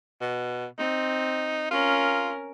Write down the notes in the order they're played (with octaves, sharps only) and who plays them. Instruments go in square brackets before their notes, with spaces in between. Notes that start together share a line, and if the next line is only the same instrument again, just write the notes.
[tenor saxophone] B2
[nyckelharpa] C4 [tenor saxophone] D#4
[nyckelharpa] C#4 A#4 [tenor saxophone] F4